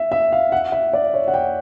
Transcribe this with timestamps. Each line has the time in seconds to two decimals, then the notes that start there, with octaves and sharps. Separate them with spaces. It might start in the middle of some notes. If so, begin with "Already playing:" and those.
Already playing: E5
0.12 E5
0.32 F5
0.52 F#5
0.72 E5
0.93 D5
1.14 C#5
1.28 F#5
1.34 G5